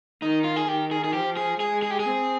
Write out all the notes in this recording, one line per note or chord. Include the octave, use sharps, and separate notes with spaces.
D#3 D#4
F4
G#4
D#3 G4
G#4
G#4
F3 G4
G#4
G#3 G#4
G#4
G4
G#4
C4